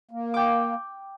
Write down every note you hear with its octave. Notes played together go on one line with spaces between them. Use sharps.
A#3
G5 D6